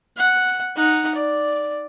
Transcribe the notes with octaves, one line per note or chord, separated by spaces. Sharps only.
F#5
D#4 F#5
D5